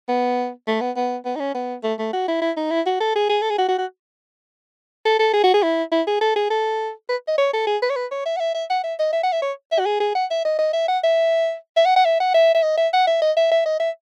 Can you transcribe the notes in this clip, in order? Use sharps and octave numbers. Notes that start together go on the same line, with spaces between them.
B3
A3
B3
B3
B3
D#4
C#4
B3
A3
A3
F#4
E4
E4
D#4
E4
F#4
A4
G#4
G#4
A4
G#4
F#4
F#4
F#4
A4
A4
G#4
F#4
G#4
E4
E4
G#4
A4
G#4
A4
B4
D#5
C#5
A4
G#4
B4
C#5
B4
C#5
E5
F#5
E5
E5
F#5
E5
D#5
E5
F#5
E5
C#5
E5
F#4
G#4
G#4
F#5
E5
D#5
D#5
E5
F#5
E5
E5
F#5
F#5
E5
F#5
E5
E5
D#5
E5
F#5
E5
D#5
E5
E5
D#5
E5